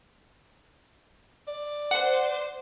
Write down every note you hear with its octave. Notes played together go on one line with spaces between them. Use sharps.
D5
C5 F#5